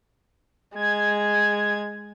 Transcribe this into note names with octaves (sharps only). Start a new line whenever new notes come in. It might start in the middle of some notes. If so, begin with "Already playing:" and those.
G#3 G#6